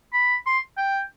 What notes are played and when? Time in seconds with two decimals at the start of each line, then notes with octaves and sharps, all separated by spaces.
0.13 B5
0.46 C6
0.77 G5